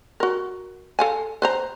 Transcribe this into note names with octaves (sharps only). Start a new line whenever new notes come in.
F#4 A#4
A4 F5 G#5
B4 C5 A#5